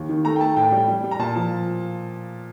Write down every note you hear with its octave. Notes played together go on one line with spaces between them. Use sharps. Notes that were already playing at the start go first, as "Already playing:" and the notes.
Already playing: D#2
D#3
A3 A#5
G5
A3 A5
A2 G5
G3
G3
G3
A#5
A#2 A5
F3